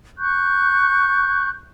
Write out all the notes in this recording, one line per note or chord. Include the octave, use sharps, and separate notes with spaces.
C#6 F#6 G6